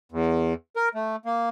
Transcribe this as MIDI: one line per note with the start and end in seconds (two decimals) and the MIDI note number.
0.12 0.54 40
0.76 0.89 70
0.95 1.16 57
1.26 1.49 58